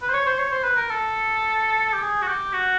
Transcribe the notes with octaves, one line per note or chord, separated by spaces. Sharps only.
B4
C5
C#5
C5
C#5
C5
B4
A#4
A4
G4
G#4
F#4
G4
F#4